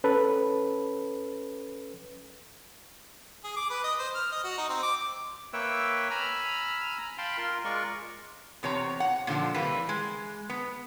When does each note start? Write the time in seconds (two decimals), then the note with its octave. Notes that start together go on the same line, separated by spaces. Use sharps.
0.04 C#4 A4 B4
3.44 G#4
3.56 D6
3.70 B4
3.84 D#5
3.99 C5
4.15 F6
4.32 D#5
4.44 F#4
4.58 D#4
4.69 C4
4.83 D6
5.53 A#3 B4 C#5 E5 G5 E6
6.11 G#5 A#5 B5 E6 F6
7.18 F5 G5 A5 B5 C6
7.38 F4 A#4 C6
7.65 G#3 F4 A#4 D5 C#6
8.63 E2 C3 C#5 A#5
9.00 F#5
9.27 A#2 D3 E3 F3
9.54 C3 E3 G3 A#3 B4
9.89 G#3
10.50 B3